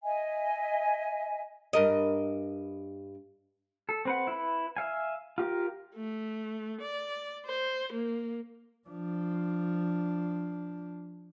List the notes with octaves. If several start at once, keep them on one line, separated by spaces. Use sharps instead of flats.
D#5 E5 G#5
G2 A#4 D#5
A4
C4 B4 F#5
E4 B4
E5 F5 G#5
F4 G4 A#4
A3
D5
C5
A#3
F3 D4